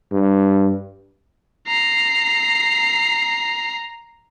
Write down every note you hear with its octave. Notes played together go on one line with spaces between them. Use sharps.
G2
A#5 C7